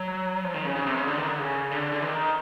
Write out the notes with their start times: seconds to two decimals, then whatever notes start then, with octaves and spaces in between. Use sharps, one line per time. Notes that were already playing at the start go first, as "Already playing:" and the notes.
Already playing: F#3
0.44 F3
0.54 D#3
0.65 C#3
0.76 C#3
0.87 C3
0.97 C#3
1.07 D3
1.17 D#3
1.28 D3
1.39 C#3
1.71 D3
1.92 D3
2.02 D#3